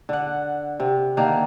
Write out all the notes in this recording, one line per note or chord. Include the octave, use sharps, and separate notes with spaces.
D3 F#5
C3
D3 D#3 A#3